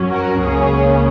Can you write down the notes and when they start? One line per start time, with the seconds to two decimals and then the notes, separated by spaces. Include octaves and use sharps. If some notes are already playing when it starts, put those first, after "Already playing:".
Already playing: F#2 F#3 C#4
0.10 F#4 A#4
0.41 C#2 C#3 A#3 C#4 G#4 C#5